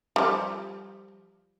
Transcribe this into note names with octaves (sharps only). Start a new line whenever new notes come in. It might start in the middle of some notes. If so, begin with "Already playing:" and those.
F3 G3